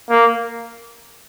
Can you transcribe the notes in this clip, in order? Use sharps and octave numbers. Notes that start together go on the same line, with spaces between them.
A#3